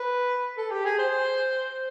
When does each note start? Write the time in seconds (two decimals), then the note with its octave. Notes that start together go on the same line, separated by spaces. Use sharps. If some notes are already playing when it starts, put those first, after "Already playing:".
Already playing: B4
0.58 A4
0.71 G4
0.85 G#4
0.99 C5